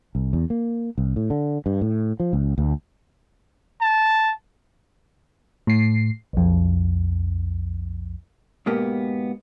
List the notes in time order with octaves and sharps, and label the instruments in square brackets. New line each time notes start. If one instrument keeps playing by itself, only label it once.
[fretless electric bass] C2
E2
A#3
C2
A2
D3
G2
A2
F3
C#2
D2
[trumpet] A5
[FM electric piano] A2 C7
B1 F2
[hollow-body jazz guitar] G#2 B2 A#3 B3 G4